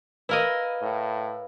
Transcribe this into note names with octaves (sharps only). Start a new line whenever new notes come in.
E4 A#4 B4 D#5 F5
A2